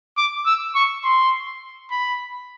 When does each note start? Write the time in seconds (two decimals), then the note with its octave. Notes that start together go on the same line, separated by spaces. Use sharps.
0.18 D6
0.46 E6
0.75 C#6
1.05 C6
1.91 B5